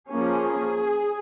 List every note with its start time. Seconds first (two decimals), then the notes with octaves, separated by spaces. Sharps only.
0.11 F3 A#3 C#4 G#4